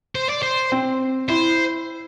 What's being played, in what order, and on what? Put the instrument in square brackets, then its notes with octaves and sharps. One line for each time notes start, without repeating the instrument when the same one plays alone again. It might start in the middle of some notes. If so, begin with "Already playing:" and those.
[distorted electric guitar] C5
D5
C5
[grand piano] C4
[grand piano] E4 [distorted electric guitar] C5